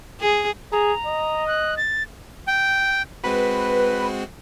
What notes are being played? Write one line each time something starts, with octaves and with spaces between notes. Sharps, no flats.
G#4
G#4 A#5
D#5
F#6
A6
G5
G#3 C4 F#4 B4